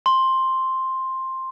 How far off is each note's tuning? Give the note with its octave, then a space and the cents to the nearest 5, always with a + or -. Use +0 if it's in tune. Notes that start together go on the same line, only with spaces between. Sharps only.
C6 +5